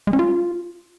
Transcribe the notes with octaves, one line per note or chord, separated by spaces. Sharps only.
G#3
C#4
F4